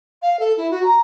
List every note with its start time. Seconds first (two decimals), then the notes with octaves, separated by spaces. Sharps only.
0.22 F5
0.39 A4
0.57 E4
0.71 F#4
0.83 A#5